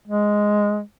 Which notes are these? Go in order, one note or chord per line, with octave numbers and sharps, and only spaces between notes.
G#3